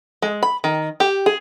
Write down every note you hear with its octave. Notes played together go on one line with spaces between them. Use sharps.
G#3
B5
D#3
G4
G#4